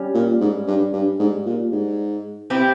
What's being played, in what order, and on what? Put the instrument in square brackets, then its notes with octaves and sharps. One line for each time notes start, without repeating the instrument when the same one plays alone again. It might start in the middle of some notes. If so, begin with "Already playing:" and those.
Already playing: [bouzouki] G3 C#4
[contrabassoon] A#2
G#2
G2
G2
G#2
A#2
G#2
[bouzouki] C4 E4 G4